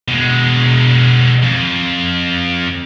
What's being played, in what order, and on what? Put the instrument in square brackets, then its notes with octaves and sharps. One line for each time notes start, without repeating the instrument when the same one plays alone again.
[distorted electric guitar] B2 G#3
F2